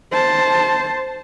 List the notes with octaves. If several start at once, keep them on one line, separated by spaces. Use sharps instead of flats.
C5 A5